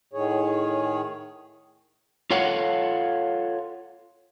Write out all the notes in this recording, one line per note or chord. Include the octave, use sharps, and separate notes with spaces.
A2 D#3 G#4 C#5
F4 A4 C#5 F5 F#5